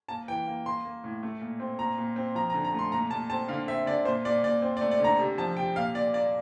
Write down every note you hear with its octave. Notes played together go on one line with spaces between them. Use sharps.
A#3 A5
E3 G5
A#3
A#3 C6
A#3
A2
A3
A#2
C4
A#2 A#5
A#2
C4
F3 A#5
A#5
D3
A#5
A3 C6
A#2 A#5
A#2 A5
C4 A5
D3 F5
C4 E5
D3 D5
A#2 C5
A#2 D5
A#2 D5
C4
D5
A3
D5
D3 A#5
C3
F3 A5
C3 G5
A#2 F5
A#2 D5
A#3 D5